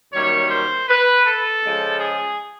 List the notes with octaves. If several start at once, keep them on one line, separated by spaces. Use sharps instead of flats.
F#2 D#3 G3 A#3 C#5
C5
B4
A4
C#3 F3 G#3
G#4